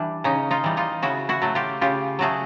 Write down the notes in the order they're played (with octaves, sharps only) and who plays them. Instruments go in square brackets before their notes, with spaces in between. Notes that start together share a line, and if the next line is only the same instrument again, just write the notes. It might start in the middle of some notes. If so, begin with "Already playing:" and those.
Already playing: [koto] E3 G3 D4 E4
C#3 C#4 D#4
D#4 F4
E3 G3
D#4 F4
C#3 E4 F#4
E4 F#4
F#3 A3
F4 G4
C#3 F4 G4
F#3 A3 F#4 G#4